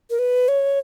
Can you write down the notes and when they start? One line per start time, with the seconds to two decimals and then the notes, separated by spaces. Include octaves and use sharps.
0.10 A#4
0.19 B4
0.48 C#5